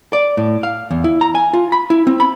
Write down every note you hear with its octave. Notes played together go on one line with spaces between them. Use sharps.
D5
A2
F5
E2
E4
A#5
G#5
F4
B5
E4
C4
B5